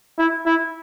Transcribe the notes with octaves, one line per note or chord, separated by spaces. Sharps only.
E4
E4